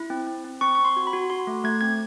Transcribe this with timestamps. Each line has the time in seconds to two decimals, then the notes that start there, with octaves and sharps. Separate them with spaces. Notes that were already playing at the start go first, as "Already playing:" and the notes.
Already playing: E4
0.10 C4
0.27 C4
0.44 C4
0.61 C4 C#6
0.75 C4 C#6
0.85 C6
0.96 F#4
1.07 B5
1.13 F#4
1.30 F#4 C6
1.47 A3
1.64 A3 G#6
1.81 C4 G#6